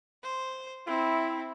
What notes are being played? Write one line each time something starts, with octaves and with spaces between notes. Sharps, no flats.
C5
C4 E4